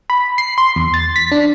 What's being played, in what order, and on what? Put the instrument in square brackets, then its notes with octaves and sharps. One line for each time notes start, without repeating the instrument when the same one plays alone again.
[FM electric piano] B5
C7
C6
E2
A6
B6
D4